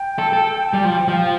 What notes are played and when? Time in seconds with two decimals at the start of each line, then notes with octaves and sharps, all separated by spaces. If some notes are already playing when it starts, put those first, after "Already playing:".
Already playing: G5
0.19 A4
0.33 A4
0.73 G3
0.85 F3
1.08 F3